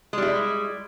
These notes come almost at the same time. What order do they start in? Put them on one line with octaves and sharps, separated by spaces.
G#3 G3 E4